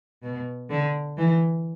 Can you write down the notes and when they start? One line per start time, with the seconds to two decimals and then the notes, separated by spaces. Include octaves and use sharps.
0.23 B2
0.70 D3
1.17 E3